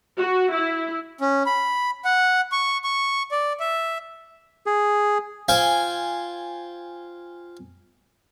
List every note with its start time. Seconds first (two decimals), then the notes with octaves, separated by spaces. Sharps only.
0.17 F#4
0.52 E4
1.21 C#4
1.46 B5
2.05 F#5
2.52 C#6
2.84 C#6
3.31 D5
3.60 E5
4.66 G#4
5.48 F4 C5 G5 G#5